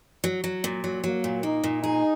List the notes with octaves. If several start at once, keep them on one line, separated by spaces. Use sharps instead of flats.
F#3
F#3
A#2
F#3
F#3 A#3
A#2
A#3 D#4
A#2
D#4 G#4